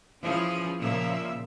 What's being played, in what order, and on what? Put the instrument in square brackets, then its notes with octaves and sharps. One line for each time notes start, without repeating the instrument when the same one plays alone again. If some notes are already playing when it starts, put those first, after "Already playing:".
[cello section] E3 F3 C#4 G#4
A#2 C#3 F3 A#3 E5